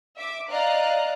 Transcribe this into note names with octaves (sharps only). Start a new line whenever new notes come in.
E5 D6
D5 D#5 F5 A#5 F#6